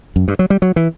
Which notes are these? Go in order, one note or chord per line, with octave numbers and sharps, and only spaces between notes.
F#2
G2
F#3
G3
F#3
E3